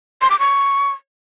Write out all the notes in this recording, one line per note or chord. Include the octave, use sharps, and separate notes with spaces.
C6
D6
C#6